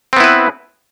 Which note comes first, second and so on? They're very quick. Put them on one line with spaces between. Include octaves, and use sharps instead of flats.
C4 B3 E4 B4